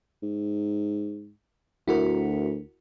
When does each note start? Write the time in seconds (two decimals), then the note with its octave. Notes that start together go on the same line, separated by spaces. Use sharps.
0.23 G#2
1.88 D2 E4 F#4 A#4